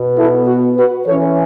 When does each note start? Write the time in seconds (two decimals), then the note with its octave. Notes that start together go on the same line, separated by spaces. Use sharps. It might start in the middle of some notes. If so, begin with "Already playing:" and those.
Already playing: B2 B3
0.18 E4 A4
0.47 F#4
0.76 F#4 B4
1.06 E3 C#4 A4 C#5